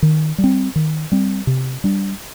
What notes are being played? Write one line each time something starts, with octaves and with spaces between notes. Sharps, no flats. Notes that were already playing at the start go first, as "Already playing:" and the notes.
D#3
G3
C4
D#3
G3 C4
C3
G3 D4